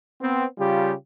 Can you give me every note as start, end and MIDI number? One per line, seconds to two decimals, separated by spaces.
0.21 0.45 59
0.21 0.45 60
0.58 0.92 49
0.58 0.92 55
0.58 0.92 65
0.58 0.92 67